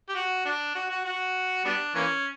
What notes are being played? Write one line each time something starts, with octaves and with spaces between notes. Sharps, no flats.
G4
F#4
D4
F#4
F#4
F#4
G3 B3 D4
E3 A#3 C#4